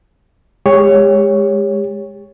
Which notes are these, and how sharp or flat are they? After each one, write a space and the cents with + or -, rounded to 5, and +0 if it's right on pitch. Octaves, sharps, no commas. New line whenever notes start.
G#3 +0 G4 +35 C#5 +0